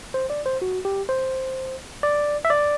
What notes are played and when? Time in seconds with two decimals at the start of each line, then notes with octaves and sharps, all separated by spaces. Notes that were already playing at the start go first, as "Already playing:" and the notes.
0.14 C5
0.30 D5
0.46 C5
0.62 F#4
0.85 G4
1.09 C5
2.03 D5
2.45 E5
2.50 D5